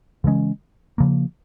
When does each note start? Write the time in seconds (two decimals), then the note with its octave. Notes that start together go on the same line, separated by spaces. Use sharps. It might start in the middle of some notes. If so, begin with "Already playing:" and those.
0.24 C#3 E3 G#3 C#4
0.98 C#3 F3 A#3